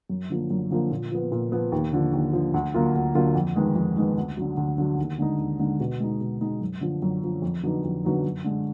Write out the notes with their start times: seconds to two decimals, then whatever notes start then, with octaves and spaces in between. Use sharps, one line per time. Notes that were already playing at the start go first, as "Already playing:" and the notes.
0.09 F#2
0.30 D3 F3 A#3
0.50 F#2
0.71 D3 F3 A#3
0.91 A#2
1.12 F3 B3
1.32 A#2
1.52 F3 B3
1.72 D#2
1.93 D3 F3
2.13 D#2
2.33 D3 F3
2.54 D2
2.74 D3 F#3 A#3 F4
2.95 D2
3.15 D3 F#3 A#3 F4
3.35 F2
3.56 D#3 G#3 B3
3.76 F2
3.96 D#3 G#3 B3
4.17 D2
4.37 D3 F#3
4.57 D2
4.78 D3 F#3
4.98 D#2
5.18 D3 G#3 D#4
5.39 D#2
5.59 D3 G#3 D#4
5.80 B2
6.00 G#3 D#4
6.21 B2
6.41 G#3 D#4
6.61 F#2
6.81 D3 F3
7.02 F#2
7.22 D3 F3
7.42 F2
7.63 D3 F#3 B3 D#4
7.84 F2
8.04 D3 F#3 B3 D#4
8.24 F#2
8.44 D3 G#3